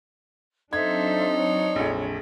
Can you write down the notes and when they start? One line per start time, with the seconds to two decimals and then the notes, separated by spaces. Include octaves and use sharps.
0.73 F#3 C4 D4 D#4 A4 C5 E5 G#6
1.35 C#5
1.76 A#1 F2